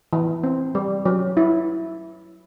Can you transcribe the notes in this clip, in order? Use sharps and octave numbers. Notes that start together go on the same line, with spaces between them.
E3
C4
G3
F#3
E4